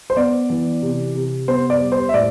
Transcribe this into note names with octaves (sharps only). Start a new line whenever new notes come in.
C5
B3 D5
E3
C3
C3
B3 C5
D5
G3
C5
E5
A2 D5